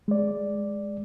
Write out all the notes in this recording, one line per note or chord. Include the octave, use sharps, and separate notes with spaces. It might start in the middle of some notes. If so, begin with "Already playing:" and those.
G#3 D5